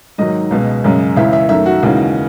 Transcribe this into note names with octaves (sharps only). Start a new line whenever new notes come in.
G#2 D#3 F#3 D#5
C#2 B2 G#3
F#2 C#3 G#3
C#2 C#3 E3 E5
E5
F#2 D#3 A3 E5
F#4
D#2 C#3 E3 G#3